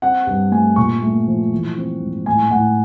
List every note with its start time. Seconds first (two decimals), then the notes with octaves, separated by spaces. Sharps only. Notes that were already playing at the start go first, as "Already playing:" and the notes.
0.02 C4 F#5
0.27 G2
0.51 A3 G#5
0.76 A#2 C#6
1.02 A3
1.27 F3
1.52 E3
1.77 C4
2.02 G#2
2.26 A2 G#5
2.51 A2 F#5